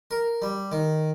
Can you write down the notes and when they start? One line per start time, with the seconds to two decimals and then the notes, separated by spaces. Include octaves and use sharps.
0.11 A#4
0.42 G3
0.72 D#3